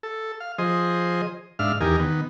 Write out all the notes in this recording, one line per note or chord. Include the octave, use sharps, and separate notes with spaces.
A4
F5
F3 G#4 C5 D#5
G#2 D4 E5 F5 F6
E2 D#4 G4 A#4 G#5
D#3 B3